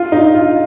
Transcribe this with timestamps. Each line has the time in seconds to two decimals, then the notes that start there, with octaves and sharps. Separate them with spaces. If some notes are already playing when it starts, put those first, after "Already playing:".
Already playing: F4
0.12 D#4
0.35 F4